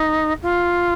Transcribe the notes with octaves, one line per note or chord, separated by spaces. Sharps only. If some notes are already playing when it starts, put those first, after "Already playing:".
Already playing: D#4
F4